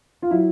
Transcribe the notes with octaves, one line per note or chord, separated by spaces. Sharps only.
F4
F#3 E4